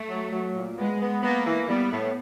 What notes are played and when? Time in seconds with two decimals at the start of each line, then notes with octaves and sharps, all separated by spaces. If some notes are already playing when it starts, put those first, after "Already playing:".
Already playing: A3
0.09 F#3
0.32 F#3
0.55 A#2
0.78 G#3 B3
1.01 B3
1.23 A#3 B3
1.47 E3
1.69 G3 B3
1.91 A2